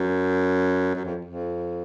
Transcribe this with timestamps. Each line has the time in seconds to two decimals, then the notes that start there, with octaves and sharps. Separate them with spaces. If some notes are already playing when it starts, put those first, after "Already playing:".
Already playing: F#2
0.95 F#2
1.05 F2
1.25 F2